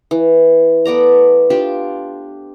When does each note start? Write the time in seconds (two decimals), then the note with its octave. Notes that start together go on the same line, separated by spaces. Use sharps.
0.11 E3
0.85 A3 B3 D5 A#5
1.50 D4 F4 G4